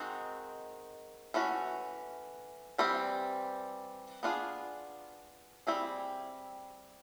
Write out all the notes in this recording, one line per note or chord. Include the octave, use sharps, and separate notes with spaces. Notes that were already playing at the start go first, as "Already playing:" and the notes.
Already playing: D#3 G#3 C4 D#4 F#4
E3 A3 C#4 F#4
E3 G3 C4
B3 D4 F4 G#4
G3 C4 E4 G#4